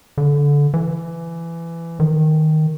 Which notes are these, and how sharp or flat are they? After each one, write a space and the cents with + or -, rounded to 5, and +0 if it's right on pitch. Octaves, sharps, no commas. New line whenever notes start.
D3 -20
E3 +20
D#3 +0